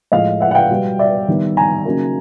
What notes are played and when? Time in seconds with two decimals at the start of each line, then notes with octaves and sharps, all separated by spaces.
0.12 A2 F3 G#3 D#5 F5
0.41 E5 F#5
0.51 F#5
0.55 F5 G5
0.70 B2 G3 B3
0.99 D5 E5
1.28 D#3 G3 B3
1.57 G#5 A#5
1.85 C#3 F#3 A#3 D#4